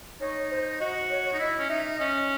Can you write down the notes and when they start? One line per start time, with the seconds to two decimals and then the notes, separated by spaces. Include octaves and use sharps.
0.21 D#4 C#5
0.51 C5
0.80 F#4 D#5
1.10 C#5
1.33 D#4
1.39 E4 D#5
1.59 C#4
1.69 D#4 E5
1.98 C#4 D#5